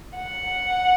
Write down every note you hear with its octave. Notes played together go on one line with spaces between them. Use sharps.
F#5